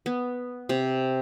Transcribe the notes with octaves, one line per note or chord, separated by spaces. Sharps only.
B3
C3